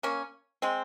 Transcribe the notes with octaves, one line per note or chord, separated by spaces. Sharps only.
A#3 C#4
G#3 C4